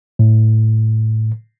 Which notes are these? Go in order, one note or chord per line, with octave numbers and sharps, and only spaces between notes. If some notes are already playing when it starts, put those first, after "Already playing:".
A2